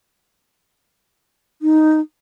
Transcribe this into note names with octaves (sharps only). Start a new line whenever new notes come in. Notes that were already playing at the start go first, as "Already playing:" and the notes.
D#4